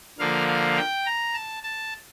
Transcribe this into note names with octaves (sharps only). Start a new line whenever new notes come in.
D3 F3 A#3 F5
F5
G5
A#5
A5
A5